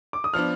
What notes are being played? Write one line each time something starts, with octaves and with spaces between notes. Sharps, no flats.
D6
D#6
F3 B3 D4 F6